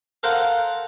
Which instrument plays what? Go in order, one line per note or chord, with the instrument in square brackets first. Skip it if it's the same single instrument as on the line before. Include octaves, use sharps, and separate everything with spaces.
[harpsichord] A4 A#4 C5 F5 F#5 A#5